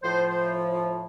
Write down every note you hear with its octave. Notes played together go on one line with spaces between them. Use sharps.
A2 F3 C5
C5